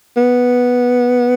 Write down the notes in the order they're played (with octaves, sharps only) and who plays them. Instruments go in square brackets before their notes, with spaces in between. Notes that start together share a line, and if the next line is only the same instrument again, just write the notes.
[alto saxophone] B3